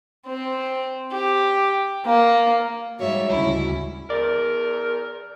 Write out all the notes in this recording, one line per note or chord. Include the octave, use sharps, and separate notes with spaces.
C4
G4
A#3
G#2 G3 F#4 C#5 E5
D2 C#3 C#4 E4
E2 A4 A#4 D5